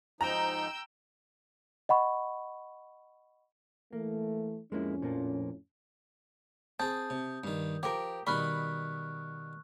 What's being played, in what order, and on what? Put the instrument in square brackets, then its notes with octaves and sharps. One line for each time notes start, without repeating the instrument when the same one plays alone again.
[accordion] G#2 F3 D#4 [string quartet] G5 E6 G6 [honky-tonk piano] A#5
[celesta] D#5 F#5 B5 C#6
[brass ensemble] E3 A3 [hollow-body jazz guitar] A#3
[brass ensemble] F2 A2 C#4 [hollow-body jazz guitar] G#3 A#3 E4
[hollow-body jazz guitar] A#2 F3 A#3
[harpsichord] C4 G#4 [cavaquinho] A5 [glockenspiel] D#6 G6
[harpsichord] C3
G2 D#3
[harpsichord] F3 [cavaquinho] G4 A#4
[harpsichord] B2 D#3 G3 [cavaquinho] B5 [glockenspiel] C#6 F6 F#6